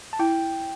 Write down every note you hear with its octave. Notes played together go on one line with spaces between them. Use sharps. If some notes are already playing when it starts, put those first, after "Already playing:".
A5
E4 G5